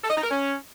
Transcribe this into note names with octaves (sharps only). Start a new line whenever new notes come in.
A4
D#5
D#4
A#4
C#4